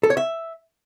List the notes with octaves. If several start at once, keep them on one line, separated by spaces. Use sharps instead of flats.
A4
C#5
E5